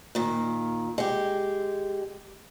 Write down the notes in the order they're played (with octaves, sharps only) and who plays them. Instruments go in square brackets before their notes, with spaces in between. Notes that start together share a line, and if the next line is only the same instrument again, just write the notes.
[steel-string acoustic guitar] A#2 D#3
G#3 G4